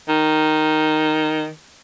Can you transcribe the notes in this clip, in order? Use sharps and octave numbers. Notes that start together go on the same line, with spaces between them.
D#3